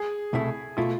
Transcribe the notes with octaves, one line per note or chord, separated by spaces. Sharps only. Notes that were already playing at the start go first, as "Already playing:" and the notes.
Already playing: G#4
C2 B2 A3 E4
B2 A3 E4 F4